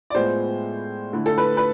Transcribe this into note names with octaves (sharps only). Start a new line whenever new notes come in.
D5
A2 G#3 B3 F4 C5
D3 A3 E4
A4
B4
B4